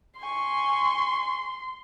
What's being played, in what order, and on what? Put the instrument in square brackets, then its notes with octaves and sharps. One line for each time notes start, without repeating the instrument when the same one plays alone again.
[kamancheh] G#5 C#6 [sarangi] C6